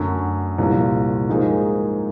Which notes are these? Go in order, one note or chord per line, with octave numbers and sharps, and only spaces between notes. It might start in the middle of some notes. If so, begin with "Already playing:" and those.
Already playing: F#2 D3 F#3 A3
C2 A#2 F3
G#2 F3 A#3 D#4 G#4